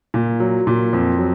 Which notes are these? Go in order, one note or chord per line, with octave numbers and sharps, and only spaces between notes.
A#2
F#3
A#2
F2
F#3